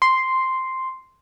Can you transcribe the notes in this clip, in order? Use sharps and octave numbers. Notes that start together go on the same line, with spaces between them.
C6